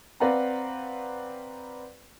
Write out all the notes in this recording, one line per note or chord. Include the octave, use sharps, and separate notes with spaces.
C4 B4 D5 F5 F#5 A#5